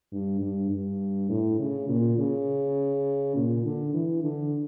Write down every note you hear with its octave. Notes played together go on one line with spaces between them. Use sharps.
G2
G2
G2
A2
C#3
A#2
C#3
A#2
D3
E3
D3